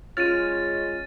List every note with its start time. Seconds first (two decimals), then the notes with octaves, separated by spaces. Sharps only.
0.17 G#3 C#4 F4 F6 A6 D#7